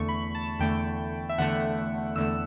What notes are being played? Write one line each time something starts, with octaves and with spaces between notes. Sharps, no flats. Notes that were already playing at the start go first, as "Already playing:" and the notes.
Already playing: E2 D3 A3 C#6
B5
A5
E2 D3 A3 G5
E5
E2 D3 A3 F#5
E2 D3 A3 E6